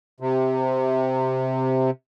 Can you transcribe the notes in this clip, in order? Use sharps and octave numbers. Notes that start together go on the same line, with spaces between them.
C3